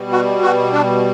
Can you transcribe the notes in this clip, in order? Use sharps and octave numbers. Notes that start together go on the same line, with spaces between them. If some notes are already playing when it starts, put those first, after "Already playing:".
Already playing: B2 G3
F#4
F#4
D4